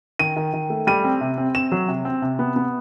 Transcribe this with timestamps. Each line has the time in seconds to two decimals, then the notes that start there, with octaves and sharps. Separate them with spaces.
0.19 D#3 D#7
0.36 D#3
0.54 D#3
0.70 A3
0.87 G3 D#7
1.04 C4
1.21 C3
1.38 C4
1.54 C4 E7
1.72 F#3
1.88 C3
2.05 C4
2.22 C3
2.39 B3
2.56 B3